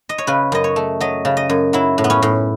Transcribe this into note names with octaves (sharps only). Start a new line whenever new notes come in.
D#5
C#5
C#3 B4
F#2 D#5
C#5
A3
F#3 D#5
C#3
D#5
F#2
F#3 E4
A2
B3
C#4
A2